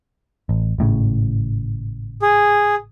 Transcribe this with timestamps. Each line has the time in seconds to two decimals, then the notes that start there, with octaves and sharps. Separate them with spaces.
0.49 A1
0.78 G#1 A2 C#3
2.22 G#4